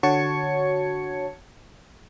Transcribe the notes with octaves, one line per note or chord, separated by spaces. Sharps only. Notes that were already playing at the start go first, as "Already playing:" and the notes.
D3 F#4 C#5 A5 G#6 C#7